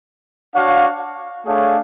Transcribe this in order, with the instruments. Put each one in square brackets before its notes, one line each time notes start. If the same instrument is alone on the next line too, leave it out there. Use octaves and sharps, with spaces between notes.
[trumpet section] D4 F#4 C#5 F5
A3 D4 G#4 C#5 F5